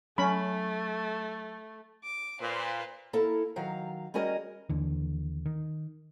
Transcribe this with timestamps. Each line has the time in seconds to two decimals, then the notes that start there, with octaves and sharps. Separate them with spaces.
0.18 F#3 A3 C#4 B5
2.04 D6
2.39 A#2 B4 C5
3.13 A#3 E4 A4 A#4
3.56 D#3 F#3 F5 A#5
4.14 G3 C#4 F#4 G#4 A#4 D#5
4.70 D#2 D3 E3
5.46 D#3